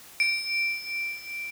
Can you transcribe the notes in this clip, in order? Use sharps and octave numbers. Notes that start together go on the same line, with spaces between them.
D7